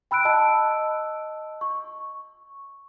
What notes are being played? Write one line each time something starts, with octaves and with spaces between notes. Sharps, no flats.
G5 B5 E6 F#6 D7
D#5 A5 E6
C#6